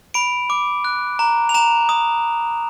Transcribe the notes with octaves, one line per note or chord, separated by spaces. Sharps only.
B5 D7
D6
F#6
A#5
F7
A#5 E7
D#6